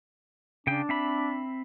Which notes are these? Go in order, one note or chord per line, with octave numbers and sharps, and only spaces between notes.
C#3 D4 G5
C4 E5 B5